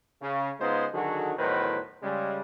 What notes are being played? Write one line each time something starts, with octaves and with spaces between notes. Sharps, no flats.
C#3
C#3 G#3 B3 D#4 F4 C5
D3 D#3 F#3 F#4 G#4 A4
E2 A2 D#3 F#3 B4 C5
C#3 G3 G#3